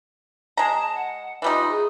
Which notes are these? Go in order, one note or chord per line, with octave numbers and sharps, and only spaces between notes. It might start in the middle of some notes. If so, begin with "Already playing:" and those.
G#3 A5 A#5
F#5
E3 G3 D#4 F4
G#4